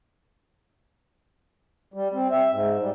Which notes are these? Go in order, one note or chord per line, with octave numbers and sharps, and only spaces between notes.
G3
C4
E5
G#2
G3